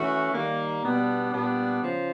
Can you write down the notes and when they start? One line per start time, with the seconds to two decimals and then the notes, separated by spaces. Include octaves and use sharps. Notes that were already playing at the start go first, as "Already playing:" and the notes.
Already playing: E3 A3 C#4 F#4
0.32 D#3 G3 A#3
0.82 B2 G3 B3 D4
1.32 A#2 G3 B3 D4
1.82 C#3 F3